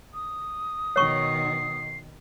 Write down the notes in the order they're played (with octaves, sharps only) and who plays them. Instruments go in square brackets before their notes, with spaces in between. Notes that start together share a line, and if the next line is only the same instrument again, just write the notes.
[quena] D#6
[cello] B2 D#3 [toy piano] C#5 C#6 [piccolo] C7